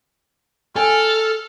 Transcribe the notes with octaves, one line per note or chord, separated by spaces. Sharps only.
A4 G5 G#5 F6